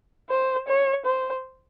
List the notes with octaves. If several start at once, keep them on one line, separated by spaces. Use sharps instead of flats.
C5
C#5
C5